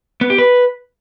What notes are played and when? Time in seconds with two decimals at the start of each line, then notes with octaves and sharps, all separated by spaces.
0.21 B3
0.30 G4
0.38 B4